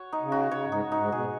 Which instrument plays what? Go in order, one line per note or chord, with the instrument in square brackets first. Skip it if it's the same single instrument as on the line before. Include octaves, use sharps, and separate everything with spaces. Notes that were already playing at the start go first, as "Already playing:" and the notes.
Already playing: [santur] F#4 C#5
D#4
[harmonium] C#3
[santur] F#4
[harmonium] C#3 [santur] C#5
[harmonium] G#2 [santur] D#4
[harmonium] G#2 [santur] D#4
[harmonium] B2 [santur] G#4